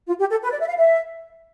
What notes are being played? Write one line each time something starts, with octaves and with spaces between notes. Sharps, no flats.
F4
G4
A4
B4
D5
E5
F5
E5